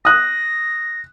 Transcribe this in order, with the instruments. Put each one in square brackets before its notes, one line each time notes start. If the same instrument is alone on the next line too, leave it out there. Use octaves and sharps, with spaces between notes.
[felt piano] D#6 F#6 [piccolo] A#6